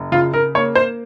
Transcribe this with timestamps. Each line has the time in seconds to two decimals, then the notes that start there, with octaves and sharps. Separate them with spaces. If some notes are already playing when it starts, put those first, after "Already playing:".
Already playing: F#1
0.12 C#3 F4
0.34 A#4
0.55 A#3 C#5
0.75 C5